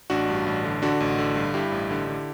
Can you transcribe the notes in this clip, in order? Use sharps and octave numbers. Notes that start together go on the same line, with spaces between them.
A1 D4 F#4
G2
A1
D3
D3 D4 F#4
A1
D3
G2
G2 E4 G4
A1
D3
D3